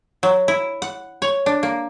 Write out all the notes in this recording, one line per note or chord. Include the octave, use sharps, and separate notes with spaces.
F#3
E4
F#5
C#5
D4
A#3